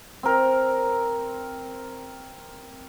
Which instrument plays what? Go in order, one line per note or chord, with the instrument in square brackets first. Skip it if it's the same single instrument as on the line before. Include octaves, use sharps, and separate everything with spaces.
[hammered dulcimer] C4 A#4